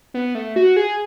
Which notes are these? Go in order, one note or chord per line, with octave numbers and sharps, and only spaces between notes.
B3
A3
F#4
G#4